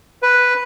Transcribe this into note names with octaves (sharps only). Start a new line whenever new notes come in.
B4